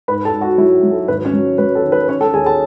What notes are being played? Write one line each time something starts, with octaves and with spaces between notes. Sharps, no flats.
G#2 B4 B5
A4 A5
G#2
F#4 F#5
F#3 E4 E5
F#3
A4
G#1 B4
C#4 C#5
F#3
F#3 B4
A4
D#3
B4
C#4 C#5
A4 A5
D#2 G#4 G#5
A4 A5